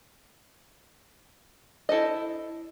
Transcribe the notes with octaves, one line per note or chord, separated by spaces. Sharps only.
E4 A4 C5 D#5